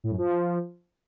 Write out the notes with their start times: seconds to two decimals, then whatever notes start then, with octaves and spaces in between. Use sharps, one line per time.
0.04 A2
0.11 F#2
0.18 F3